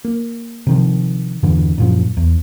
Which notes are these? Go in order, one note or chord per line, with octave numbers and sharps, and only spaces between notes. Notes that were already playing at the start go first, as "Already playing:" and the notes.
A#3
C3 D#3 F3
E2 G2 D3 E3
F#2 A#2 F3
E2